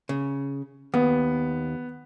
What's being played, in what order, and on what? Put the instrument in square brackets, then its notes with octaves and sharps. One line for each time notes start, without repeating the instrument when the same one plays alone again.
[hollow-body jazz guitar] C#3
[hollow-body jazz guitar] D#2 [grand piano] B3